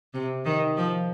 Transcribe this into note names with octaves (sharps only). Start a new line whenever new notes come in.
C3
D#3
F3